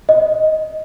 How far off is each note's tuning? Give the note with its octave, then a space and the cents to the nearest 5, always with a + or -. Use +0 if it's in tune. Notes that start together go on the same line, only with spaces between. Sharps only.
D#5 +10